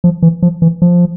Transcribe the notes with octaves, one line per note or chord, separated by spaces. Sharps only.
F3
E3
F3
E3
F3